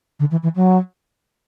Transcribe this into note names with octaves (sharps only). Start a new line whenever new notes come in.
D3
E3
E3
F#3